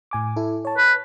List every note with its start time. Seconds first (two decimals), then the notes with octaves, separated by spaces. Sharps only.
0.11 A2 G#5 D6
0.36 E4 A4
0.65 C#5 A5
0.78 B4